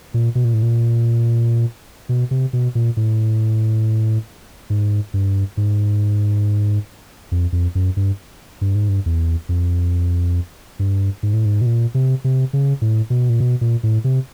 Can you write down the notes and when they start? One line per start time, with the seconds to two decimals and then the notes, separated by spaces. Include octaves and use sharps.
0.14 A#2
0.35 B2
0.44 A#2
0.54 A2
0.63 A#2
2.09 B2
2.31 C3
2.53 B2
2.75 A#2
2.97 A2
4.70 G#2
5.14 G2
5.57 G#2
7.32 F2
7.52 F2
7.75 F#2
7.96 G2
8.61 G2
8.75 G#2
8.89 G2
9.06 E2
9.49 F2
10.79 G2
11.23 G#2
11.33 A2
11.45 G#2
11.61 B2
11.66 A#2
11.94 C3
12.24 C3
12.53 C#3
12.81 A2
13.10 B2
13.29 A#2
13.40 B2
13.61 A#2
13.83 A2
14.04 C3